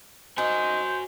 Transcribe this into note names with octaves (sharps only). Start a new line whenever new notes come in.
D#4 F#4 A#4 C5 G#5